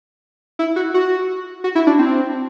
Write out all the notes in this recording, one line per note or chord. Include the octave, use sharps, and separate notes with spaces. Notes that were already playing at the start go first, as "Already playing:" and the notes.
E4
F#4
F#4
F#4
E4
D4
C4